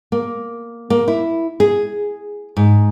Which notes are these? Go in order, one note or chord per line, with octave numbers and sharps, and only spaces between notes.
A#3
A#3
E4
G#4
G#2